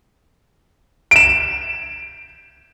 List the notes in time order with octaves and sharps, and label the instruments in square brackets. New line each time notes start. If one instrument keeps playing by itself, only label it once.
[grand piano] D7 E7